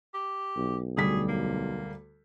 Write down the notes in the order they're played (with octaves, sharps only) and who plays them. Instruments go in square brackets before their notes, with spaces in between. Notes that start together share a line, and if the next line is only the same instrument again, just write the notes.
[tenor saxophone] G4
[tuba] B1
[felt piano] D2 G3 B6 [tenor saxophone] G#4
[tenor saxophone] A#3